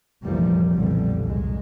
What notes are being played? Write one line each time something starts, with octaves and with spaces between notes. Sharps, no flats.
F1 A#1 E3 F3 G3 A#3
B1 F2 A#2 D3 E3 G3
C2 G#2 G#3